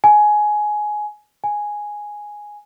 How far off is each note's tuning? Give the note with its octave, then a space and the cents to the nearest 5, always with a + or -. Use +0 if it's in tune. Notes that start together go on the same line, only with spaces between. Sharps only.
G#5 +15
G#5 +0